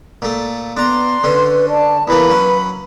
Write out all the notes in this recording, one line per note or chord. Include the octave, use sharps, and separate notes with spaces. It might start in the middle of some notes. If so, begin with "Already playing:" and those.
A#2 A3
B3 D4 A#5 C6
D3 C#4 B4
D5 A5
E2 E3 A#3 B4 B5
F#3 C#4